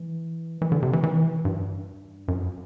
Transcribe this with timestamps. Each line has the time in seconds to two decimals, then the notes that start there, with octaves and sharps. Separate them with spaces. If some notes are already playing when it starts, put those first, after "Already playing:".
Already playing: E3
0.62 E3
0.72 D3
0.83 C3
0.93 E3
1.03 E3
1.45 G2
2.28 F#2